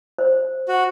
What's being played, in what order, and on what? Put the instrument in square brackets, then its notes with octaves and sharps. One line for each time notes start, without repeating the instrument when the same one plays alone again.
[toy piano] C5
[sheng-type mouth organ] F#4